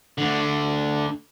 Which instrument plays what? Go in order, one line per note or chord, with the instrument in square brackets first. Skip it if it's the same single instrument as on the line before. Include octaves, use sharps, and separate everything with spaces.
[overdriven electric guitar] D2 D3